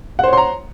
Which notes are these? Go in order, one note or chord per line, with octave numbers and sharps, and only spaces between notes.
C5 C#5 F#5 A#5 C6